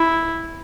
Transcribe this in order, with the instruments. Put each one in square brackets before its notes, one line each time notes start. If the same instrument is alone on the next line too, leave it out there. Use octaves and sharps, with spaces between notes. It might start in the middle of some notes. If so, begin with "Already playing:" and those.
Already playing: [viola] E4